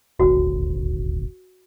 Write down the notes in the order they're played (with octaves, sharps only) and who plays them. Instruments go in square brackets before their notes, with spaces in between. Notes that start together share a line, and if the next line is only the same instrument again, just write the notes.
[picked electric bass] D#1 G#1 D2 [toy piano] F#4